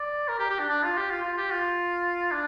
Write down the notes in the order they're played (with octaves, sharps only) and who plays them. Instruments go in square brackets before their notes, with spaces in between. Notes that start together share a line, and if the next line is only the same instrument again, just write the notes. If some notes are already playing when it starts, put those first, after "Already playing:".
Already playing: [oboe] D5
A#4
G4
G4
D4
D4
F4
G4
F4
F4
G4
F4
D4